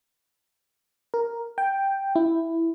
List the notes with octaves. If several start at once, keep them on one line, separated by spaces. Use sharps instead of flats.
A#4
G5
E4